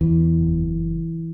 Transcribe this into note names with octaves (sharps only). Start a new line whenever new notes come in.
E2 E3
F#1